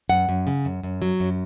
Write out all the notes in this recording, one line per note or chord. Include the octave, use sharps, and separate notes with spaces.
F#2 F#5
F#2
C#3
F#2
F#2
F#3
F#2